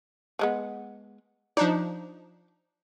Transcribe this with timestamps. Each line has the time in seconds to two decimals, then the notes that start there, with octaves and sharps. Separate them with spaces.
0.39 F3 G#3 B3
1.57 F3 D4 D#4 D5